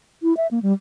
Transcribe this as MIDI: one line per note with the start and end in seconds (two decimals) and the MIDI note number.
0.23 0.36 64
0.37 0.47 76
0.51 0.59 58
0.63 0.73 55